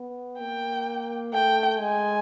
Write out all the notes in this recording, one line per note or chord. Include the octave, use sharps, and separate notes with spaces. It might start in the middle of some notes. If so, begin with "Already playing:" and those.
Already playing: B3
A#3 G5
A3 G5
G#3 G#5